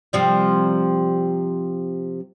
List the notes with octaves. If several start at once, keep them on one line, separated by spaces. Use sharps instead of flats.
C3 F3 G3